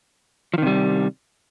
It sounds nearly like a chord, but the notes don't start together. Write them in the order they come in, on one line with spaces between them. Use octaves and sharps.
F3 D#3 C3 G3